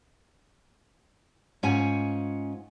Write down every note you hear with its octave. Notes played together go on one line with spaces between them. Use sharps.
G#2 C#4 F4 F#5 G#5